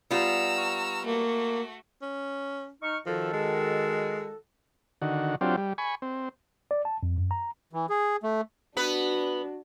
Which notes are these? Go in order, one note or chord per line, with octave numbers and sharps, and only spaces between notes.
G3 B3 F4 A#5 E6
C#6 F6
A3 A#3 F#4
C#4
D#4 C#6 F6
D#3 F3 F#4 A4
G#3
D3 D#3 F#4
F#3 C4 D4 F4 G4
G3
G#5 B5 C#6
C4
D5
A5
F2
F#2
A#5
E3
G#4
A3
B3 D4 F#4 B4